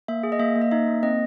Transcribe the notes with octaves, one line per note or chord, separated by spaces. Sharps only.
A#3 E5
G#4
D#5
A#3 E5
A#3
D#5
D#4 E5
A#3
C4 D#5